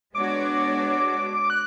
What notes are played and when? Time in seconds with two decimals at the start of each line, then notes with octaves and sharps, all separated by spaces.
0.14 G#3 B3 D4 F#4 C#5 D6
1.50 F#6